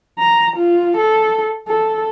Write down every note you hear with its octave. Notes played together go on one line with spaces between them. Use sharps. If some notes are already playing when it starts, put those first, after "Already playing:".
A#5
F4
A4
A4